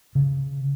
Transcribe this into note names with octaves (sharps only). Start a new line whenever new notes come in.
C#3